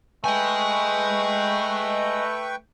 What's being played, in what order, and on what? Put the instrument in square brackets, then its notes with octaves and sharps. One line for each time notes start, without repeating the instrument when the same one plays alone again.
[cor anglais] A3 [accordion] B4 G5 C#6 [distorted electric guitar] D#5 G#5